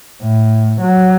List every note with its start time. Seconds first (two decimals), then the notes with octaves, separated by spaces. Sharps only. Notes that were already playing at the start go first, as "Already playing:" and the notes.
0.22 A2
0.80 F#3